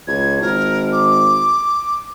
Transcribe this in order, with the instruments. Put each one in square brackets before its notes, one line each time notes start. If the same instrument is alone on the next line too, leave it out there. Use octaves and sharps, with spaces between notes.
[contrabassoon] C#2 [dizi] G#6
[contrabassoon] G#1 [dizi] A#4
[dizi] D6